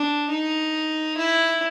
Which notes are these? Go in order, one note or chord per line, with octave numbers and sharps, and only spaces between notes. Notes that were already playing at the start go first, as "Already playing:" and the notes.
Already playing: D4
D#4
E4